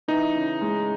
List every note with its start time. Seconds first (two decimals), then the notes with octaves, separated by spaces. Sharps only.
0.08 E3 D#4
0.35 C#3
0.61 G#3